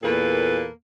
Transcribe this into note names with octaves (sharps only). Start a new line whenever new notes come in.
E2 A#2 A#3 A4 B4